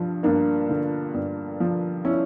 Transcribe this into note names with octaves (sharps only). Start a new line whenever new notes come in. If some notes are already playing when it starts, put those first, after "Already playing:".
Already playing: G2 F3
G2 A#3 D4
D3
G2
F3
C#4 E4